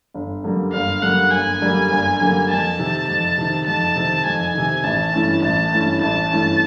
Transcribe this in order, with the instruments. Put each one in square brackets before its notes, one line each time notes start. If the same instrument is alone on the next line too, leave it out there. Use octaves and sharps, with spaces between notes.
[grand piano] G1
F#2 D3 G3 A#3
[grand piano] G1 [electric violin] F5
[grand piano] F#2 D3 G3 A#3 [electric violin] F#5
[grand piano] G1 [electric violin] G#5
[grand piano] F#2 D3 G3 A#3
G1
F#2 D3 G3 A#3
[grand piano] F2 [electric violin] A5
[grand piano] C3 D#3
F2
C3 D#3
[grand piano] F2 [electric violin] A5
[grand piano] C3 D#3
[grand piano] F2 [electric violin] G#5
[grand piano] C3 D#3
[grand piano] A1 [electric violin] A5
[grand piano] G2 E3 A3 C#4
[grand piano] A1 [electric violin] A5
[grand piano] G2 E3 A3 C#4
[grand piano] A1 [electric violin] A5
[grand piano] G2 E3 A3 C#4